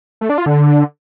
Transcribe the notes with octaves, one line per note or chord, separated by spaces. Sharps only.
A3
D4
F4
D3